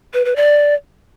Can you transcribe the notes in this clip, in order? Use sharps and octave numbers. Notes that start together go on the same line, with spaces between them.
B4
B4
D5